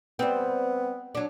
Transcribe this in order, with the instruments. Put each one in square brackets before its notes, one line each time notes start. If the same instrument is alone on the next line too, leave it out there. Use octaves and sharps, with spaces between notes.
[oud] G3 C4 [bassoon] B3
[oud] F#3 D4